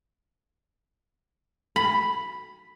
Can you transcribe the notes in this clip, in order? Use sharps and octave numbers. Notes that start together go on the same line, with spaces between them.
B5